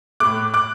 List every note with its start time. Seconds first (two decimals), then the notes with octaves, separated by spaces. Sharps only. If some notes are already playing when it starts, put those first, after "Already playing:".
0.20 A2 A3 D6 F#6
0.54 D6 F#6